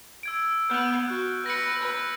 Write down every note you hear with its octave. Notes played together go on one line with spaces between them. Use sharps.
E6 G#6 D7
B3 F6 G6
F#4 F#6
B4 A#6 C#7
B4